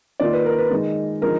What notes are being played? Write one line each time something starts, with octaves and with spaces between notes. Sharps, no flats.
D#3 A#3 F4 D5
B4
A#4
B4
D#3 G#3 D#4
D3 F3 G#3 D#4 A#4